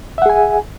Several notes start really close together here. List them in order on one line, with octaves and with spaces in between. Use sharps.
E5 F#5 G#4 G#5